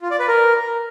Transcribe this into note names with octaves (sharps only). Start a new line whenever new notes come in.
F4
D5
B4
A#4